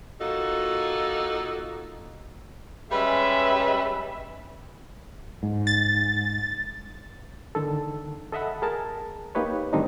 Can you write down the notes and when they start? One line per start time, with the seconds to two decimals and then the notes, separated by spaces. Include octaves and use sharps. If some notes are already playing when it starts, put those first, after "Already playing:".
0.21 A#3 D#4 F4 F#4 A4
2.91 G3 G#3 C#4 B4 E5
5.43 G#2
5.67 A6
7.55 D3 D#3 A4
8.32 A4 D#5 E5 F#5 B5
8.62 G#4 A#4 A5
9.35 A#3 D#4 G4 B4 C#5
9.73 A2 D#3 G3 C4 D4 D#4